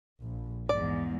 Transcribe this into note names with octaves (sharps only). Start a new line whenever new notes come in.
A#1
E2 G#2 D5